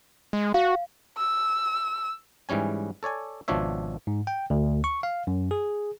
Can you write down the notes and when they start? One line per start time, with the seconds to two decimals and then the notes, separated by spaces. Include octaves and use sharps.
0.33 G#3
0.54 F#4 F5
1.18 E6
2.49 G#2 E3 G3 C#4 G#5
3.03 A4 C#5 D5 G#5
3.48 G#1 B2 F3 D4 C#5 E5
4.07 G#2
4.27 G5
4.50 D2
4.84 C#6
5.03 F5
5.27 F#2
5.51 G#4